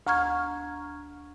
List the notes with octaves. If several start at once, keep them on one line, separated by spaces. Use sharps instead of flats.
D2 A#5 C#6 F6 G#6